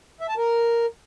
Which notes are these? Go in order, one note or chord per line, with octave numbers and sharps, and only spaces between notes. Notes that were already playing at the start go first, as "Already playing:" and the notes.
E5
A5
A#4